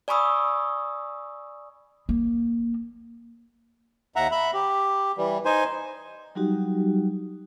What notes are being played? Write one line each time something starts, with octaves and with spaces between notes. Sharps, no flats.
D5 G#5 B5 C#6 D#6 E6
A#3
D#2 E5 F#5 A#5
E5 B5
G4
E3 G3
D#4 C5 G#5
F#3 G3 D#4 F#4 G4